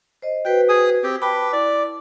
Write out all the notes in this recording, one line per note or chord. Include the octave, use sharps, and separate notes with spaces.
C5 D#5
F#4 B4 C5 G5
G#4 G#5 D#6
C4 G4 G5
B4 G5 A5 B5 D6
E4 D5